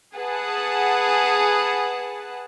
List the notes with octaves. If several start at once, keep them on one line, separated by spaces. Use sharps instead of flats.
G#4 B4 F#5 A5